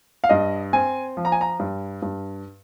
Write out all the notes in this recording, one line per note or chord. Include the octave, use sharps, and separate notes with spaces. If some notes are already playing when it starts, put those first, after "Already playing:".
F5
G2 D#5
C4 G#5
F3
A#5
G#5
A#5
G2
G2